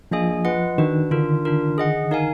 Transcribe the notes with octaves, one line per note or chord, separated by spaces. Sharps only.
F3 A#3 D4 G#4 D#5 G#5
F4 B4 D#5 F#5
D#3 D4 F#4 B4
D3 D4 F4 A#4
D4 F4 A#4
G#4 D#5 F#5
D#4 A#4 F5 G#5